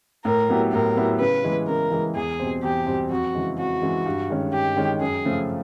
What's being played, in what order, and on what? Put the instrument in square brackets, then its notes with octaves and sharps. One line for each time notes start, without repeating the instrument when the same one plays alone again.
[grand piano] A2 [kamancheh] A#4
[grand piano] F#3 B3 E4 G4
[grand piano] A2 [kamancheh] A#4
[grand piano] F#3 B3 E4 G4
[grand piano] C#3 [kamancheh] B4
[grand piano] E3 G#3
[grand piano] C#3 [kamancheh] A#4
[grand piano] E3 G#3
[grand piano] E2 [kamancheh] G#4
[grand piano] B2 G3 C4
[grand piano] E2 [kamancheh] G4
[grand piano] B2 G3 C4
[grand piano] F2 [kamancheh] F#4
[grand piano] C#3 E3 G#3
[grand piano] F2 [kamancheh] F#4
[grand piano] C#3 E3 G#3
G2
D#3 G#3 C#4
[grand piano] G2 [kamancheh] G4
[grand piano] D#3 G#3 C#4
[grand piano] F#2 [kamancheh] G#4
[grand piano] C#3 F3 A3